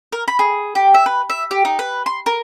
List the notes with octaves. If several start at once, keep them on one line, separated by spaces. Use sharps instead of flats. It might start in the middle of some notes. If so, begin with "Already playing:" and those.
A#4
B5
G#4
G4
E5
B4
E5
G4
D#4
B4
C6
A#4